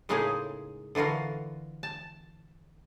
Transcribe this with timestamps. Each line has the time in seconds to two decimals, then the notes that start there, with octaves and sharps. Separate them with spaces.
0.09 A2 C#3 G#3 A#3 D#4 G#4
0.95 D3 E3 F4 F#4 A#4
1.83 A5